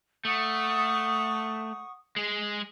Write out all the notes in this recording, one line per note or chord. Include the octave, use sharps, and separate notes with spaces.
A3 F#5 C#6 D#6
G#3 G#4